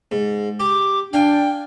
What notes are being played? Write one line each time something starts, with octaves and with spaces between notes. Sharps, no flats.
G#2
G4 D6
D4 F5 G5 G#5